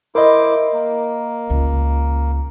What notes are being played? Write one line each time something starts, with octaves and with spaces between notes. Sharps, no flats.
E4 A#4 C5 D#5 D6
A#3
C#2